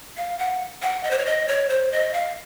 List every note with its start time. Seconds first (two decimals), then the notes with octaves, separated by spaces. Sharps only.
0.17 F5
0.39 F#5
0.82 F#5
1.03 D#5
1.11 C5
1.18 C#5
1.26 D#5
1.48 C#5
1.69 C5
1.92 D#5
2.13 F5